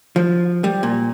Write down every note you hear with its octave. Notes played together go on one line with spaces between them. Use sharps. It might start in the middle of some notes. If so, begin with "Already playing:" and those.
F3
G3
A#2